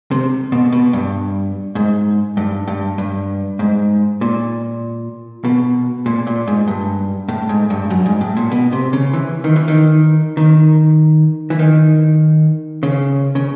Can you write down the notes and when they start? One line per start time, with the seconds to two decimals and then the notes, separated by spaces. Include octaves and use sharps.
0.11 C3
0.52 B2
0.72 B2
0.93 G2
1.75 G#2
2.37 G2
2.68 G2
2.98 G2
3.59 G#2
4.21 A#2
5.45 B2
6.06 A#2
6.27 A#2
6.47 G#2
6.68 G2
7.28 A2
7.49 G#2
7.70 G2
7.90 F#2
8.06 G#2
8.21 A2
8.37 A#2
8.52 B2
8.72 C3
8.93 C#3
9.13 E3
9.44 D#3
9.56 E3
9.68 D#3
10.37 D#3
11.50 E3
11.59 D#3
12.83 C#3
13.35 C#3